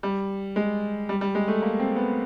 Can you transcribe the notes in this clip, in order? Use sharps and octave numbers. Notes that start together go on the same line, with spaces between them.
G3
G#3
G3
G3
G#3
A3
A#3
C4
B3